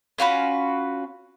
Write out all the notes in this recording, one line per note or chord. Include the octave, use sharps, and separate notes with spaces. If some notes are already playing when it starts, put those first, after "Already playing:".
C#4 F4 F#4 B4